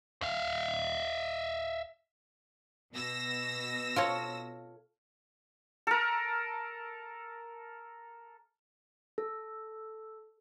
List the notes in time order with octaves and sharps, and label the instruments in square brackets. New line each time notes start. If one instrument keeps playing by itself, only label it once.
[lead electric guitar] E5 F5
[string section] B2 E6 A#6
[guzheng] F4 A4 C#5
[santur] A4 A#4
[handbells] A4